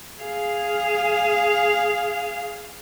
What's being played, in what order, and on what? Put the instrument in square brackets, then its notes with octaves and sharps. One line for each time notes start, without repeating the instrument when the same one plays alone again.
[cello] G#4 F5